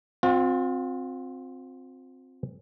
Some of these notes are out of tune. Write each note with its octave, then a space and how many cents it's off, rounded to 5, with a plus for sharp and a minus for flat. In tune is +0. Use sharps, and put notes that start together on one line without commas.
C4 +0 F4 +45